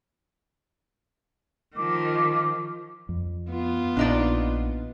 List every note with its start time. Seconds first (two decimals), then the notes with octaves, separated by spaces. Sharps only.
1.76 D#3 F3 D6
3.09 F2
3.50 B3 F4
3.97 A#1 D4 D#4 D5